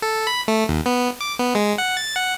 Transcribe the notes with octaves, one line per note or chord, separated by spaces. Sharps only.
A4
B5
A3
D#2
B3
D6
B3
G#3
F#5
A6
F#5